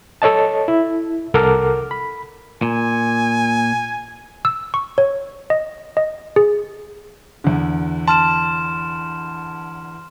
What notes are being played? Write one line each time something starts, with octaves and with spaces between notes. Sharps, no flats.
A4 C#5 D#5 A5
E4
C2 A4 A#4 F#5 D6 F6
B5
A#2 G#5
E6
C#6
C#5
D#5
D#5
G#4
E2 D3
A5 C6 F6 E7